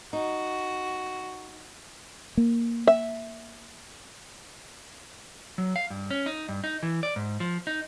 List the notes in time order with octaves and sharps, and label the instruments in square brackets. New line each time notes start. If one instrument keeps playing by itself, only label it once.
[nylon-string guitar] D#4 [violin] F#4
[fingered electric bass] A#3
[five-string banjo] E5
[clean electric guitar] F#3
F5
G2
C#4
D#4
G2
D#4
E3
D5
G#2
F3
D#4